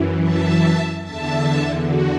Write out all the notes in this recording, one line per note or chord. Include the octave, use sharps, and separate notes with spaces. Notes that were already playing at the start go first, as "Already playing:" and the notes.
Already playing: F#2 E3
E5 A5
E2 D3 E5 A5
F#4